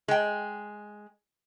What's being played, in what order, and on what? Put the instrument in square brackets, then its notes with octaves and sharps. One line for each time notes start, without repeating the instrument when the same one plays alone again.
[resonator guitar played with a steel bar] G#3 G5